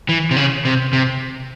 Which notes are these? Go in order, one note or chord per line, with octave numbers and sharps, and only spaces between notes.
E3
C3
C#3
C3
C3